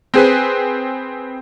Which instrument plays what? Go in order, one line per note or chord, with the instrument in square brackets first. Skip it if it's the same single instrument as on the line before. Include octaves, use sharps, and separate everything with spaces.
[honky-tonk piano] C4 G#4 B4